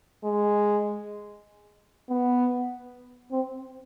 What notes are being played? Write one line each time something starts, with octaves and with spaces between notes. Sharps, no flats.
G#3
B3
C4